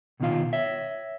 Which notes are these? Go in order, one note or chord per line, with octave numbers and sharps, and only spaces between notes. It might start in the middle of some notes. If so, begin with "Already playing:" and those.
C2 B2 D#3 A3 F4 F5
C#5 E5